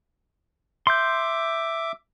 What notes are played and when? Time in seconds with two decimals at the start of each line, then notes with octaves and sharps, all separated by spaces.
0.87 E5 C6 D6 G6